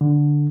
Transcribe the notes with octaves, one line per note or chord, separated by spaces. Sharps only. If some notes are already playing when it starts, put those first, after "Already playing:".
D3